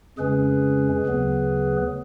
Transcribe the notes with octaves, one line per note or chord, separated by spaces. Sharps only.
F2 C#3 G#3 C#4 G#4 B4
D2 C#3 F#3 B3